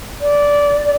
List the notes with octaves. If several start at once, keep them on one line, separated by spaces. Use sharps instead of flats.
D5